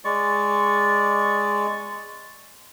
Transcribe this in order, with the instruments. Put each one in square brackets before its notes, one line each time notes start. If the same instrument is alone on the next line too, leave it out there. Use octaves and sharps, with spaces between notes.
[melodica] G#3 D5 C#6